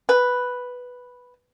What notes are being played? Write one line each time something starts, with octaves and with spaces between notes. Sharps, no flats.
B4